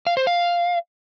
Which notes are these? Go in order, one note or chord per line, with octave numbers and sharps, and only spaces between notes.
F5
C5
F5